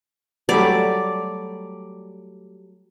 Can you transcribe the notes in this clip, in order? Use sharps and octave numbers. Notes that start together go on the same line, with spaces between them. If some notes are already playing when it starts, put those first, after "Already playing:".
F#3 G3 A3 D5